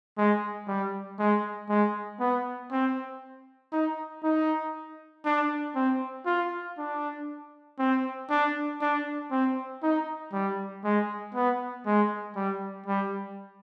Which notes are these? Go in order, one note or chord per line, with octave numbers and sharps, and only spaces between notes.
G#3
G3
G#3
G#3
B3
C4
D#4
D#4
D4
C4
F4
D4
C4
D4
D4
C4
D#4
G3
G#3
B3
G#3
G3
G3